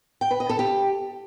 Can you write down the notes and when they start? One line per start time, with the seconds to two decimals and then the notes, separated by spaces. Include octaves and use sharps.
0.21 G5
0.31 B4
0.40 D#5
0.49 A4
0.59 G4